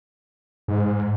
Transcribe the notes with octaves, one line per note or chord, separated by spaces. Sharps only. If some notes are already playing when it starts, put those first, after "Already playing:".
G#2